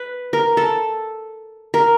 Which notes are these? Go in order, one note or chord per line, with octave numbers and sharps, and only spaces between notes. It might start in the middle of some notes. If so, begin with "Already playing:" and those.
Already playing: B4
A#4
A4
A#4